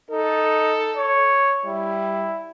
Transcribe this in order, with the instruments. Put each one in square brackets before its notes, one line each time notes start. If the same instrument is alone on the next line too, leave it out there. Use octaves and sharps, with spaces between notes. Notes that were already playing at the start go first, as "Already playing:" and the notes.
[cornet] D#4 [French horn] A4
[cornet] C#5
[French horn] G3 [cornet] E4